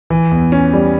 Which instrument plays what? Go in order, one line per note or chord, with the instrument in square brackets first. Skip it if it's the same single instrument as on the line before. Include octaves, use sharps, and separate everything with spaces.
[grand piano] E3
E2
C#4
G3